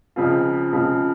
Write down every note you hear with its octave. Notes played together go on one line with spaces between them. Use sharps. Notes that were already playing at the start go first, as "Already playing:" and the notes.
C#2 C#3 F3 C4 F4
C#2 C#3 F3 C4 F4